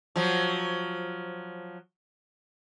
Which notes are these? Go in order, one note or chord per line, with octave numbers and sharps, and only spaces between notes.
F3 F#3